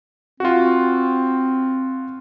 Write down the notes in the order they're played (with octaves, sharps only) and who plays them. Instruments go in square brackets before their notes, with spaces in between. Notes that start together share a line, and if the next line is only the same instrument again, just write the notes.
[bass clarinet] C4 [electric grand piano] F4 F#4